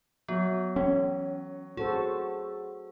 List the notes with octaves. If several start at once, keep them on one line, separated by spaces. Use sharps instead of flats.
F#3 B3
E3 C#4
F#4 G#4 A4 C5